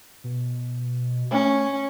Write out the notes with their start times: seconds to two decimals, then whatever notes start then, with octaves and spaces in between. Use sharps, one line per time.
0.24 B2
1.32 A3 C#4